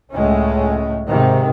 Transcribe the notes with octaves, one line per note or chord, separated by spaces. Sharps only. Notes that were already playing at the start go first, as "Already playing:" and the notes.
C#2 A2 G#3 A3 C#4
G#2 C3 D#3